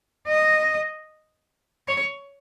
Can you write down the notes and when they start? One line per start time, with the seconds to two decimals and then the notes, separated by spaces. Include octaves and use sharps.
0.28 D#5
1.88 C#5